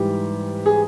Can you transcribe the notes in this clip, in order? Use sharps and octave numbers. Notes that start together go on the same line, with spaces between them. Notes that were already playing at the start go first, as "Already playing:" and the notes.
Already playing: G#2 E3 G3 G4
G#4